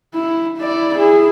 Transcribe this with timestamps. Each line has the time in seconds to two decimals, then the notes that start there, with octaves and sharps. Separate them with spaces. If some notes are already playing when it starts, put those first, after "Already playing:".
0.15 E4
0.58 E4 D5
0.95 E4 G#4